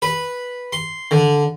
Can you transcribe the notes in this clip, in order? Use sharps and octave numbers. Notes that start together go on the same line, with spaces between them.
B4
C6
D3